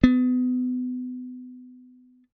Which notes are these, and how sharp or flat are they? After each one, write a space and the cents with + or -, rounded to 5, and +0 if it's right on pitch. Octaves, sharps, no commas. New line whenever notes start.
B3 +30